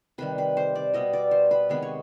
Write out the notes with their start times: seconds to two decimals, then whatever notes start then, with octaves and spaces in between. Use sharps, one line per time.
0.18 C3 D#3 G3 B4
0.38 B4
0.57 C5
0.75 D5
0.94 B2 G3 B3 D#5
1.13 D5
1.31 C5
1.51 B4
1.69 C3 D#3 G#3 B3 B4
1.83 C#5